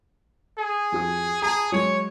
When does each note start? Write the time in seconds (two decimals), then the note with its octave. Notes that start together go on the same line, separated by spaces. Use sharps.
0.58 G#4
0.92 F2 F#4 D#6
1.42 G#4 A5 A#5
1.72 F#3 G#3 C#5